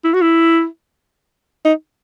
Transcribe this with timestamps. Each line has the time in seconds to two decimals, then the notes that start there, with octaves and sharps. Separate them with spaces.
0.04 E4
0.14 F#4
0.22 E4
1.65 D#4